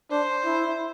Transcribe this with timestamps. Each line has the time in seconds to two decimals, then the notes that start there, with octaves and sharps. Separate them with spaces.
0.11 D4 C5
0.45 E4